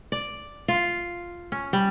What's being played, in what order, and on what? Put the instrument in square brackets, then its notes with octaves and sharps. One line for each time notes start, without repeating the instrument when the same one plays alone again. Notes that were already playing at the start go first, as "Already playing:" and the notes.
[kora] D5
F4
C#4
G3